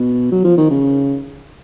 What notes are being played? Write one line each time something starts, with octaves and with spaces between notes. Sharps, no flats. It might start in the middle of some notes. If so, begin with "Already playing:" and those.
Already playing: B2
F#3
F3
D#3
C#3